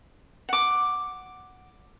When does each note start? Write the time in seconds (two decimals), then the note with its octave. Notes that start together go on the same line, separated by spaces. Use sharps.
0.49 F#5 D6